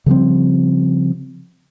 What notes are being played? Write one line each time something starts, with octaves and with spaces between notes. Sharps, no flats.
C#3 F3 G3 C4